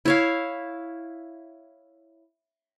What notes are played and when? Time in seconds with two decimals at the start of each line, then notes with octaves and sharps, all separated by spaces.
0.05 E4 C#5 F5